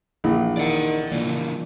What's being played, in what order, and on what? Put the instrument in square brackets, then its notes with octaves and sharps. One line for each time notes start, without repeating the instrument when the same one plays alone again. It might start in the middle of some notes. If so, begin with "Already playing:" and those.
[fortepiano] A#1 [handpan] E3 E4
[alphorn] D#3 [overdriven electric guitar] D5 F#5 [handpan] D#5
[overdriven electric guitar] C#3 E3 [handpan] A#3 F4 [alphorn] D4